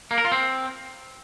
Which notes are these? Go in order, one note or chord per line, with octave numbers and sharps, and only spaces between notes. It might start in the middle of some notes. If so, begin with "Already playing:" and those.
A#3
A#4
F4
C4